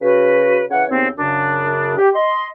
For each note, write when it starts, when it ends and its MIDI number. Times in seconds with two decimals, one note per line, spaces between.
0.02 0.64 49
0.02 0.64 66
0.02 0.64 71
0.71 0.84 49
0.71 0.84 52
0.71 0.84 73
0.71 0.84 78
0.90 1.08 39
0.90 1.08 49
0.90 1.08 59
0.90 1.08 60
1.18 1.93 42
1.18 1.93 49
1.18 1.93 62
1.97 2.09 67
2.15 2.47 75
2.15 2.47 84